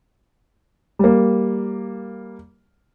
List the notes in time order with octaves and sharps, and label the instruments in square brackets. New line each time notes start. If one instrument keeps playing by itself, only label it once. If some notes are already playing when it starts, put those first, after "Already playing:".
[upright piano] G3 A#3